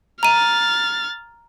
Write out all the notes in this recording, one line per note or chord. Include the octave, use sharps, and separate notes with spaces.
A#5 F6 A6 D#7